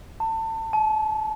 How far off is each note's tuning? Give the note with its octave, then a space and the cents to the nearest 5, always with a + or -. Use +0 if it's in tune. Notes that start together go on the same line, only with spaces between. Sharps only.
A5 +30
A5 -35